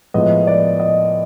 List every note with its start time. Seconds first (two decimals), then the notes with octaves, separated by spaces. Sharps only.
0.14 A2 F3 G#3 B3 D#5
0.47 D5
0.80 D#5